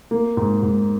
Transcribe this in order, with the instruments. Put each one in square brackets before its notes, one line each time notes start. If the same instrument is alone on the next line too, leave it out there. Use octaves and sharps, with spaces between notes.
[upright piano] A#3
G#2
G#2